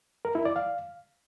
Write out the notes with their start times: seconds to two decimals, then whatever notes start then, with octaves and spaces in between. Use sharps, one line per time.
0.25 A#4
0.35 E4
0.45 D5
0.56 F5